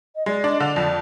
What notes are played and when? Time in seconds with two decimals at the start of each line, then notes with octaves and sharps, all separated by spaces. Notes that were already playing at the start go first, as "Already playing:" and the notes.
0.15 D#5
0.26 G#3 D5
0.44 D4
0.49 D#5
0.60 D3 D5
0.76 F2